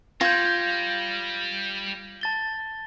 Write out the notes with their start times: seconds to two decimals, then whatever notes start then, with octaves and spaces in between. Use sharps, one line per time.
0.21 G3 F4 G6 G#6 A#6
2.21 A5 A6 G7